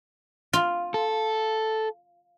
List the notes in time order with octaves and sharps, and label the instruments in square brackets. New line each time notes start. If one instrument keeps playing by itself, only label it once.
[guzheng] F4
[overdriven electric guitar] A4